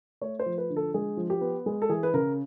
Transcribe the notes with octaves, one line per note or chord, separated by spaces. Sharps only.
A3 C#5
C5
F3
B4
D3
A4
G#3 G#4
F3
G4
B3
G#3 G#4
A4
E3 G#4
B4
C#3 A#4